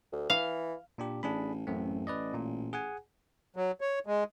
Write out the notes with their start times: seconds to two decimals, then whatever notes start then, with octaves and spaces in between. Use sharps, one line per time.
0.12 D2
0.30 E3 F5
0.98 A#2 D4 G4
1.23 A1 D4 G#4 B5
1.67 A1 F#2 A3 C4
2.07 B4 D5 D#5
2.34 A#2
2.73 G#4 F#5 G#5
3.56 F#3
3.81 C#5
4.07 G#3